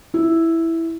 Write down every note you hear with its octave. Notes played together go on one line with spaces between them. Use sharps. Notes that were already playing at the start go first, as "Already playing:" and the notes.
E4